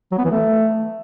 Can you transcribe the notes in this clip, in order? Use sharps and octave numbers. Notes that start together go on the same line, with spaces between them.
F#3
B3
E3
A3